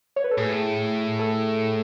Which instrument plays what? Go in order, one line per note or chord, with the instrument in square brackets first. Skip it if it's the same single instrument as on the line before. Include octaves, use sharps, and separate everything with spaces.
[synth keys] C#5
B4
A4
[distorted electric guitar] A2 [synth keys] G#4
[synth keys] A4